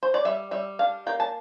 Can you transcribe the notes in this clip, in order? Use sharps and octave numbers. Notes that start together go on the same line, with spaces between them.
C5
D5
G3 E5
G3 E5
D4 F5
A#3 G5
A5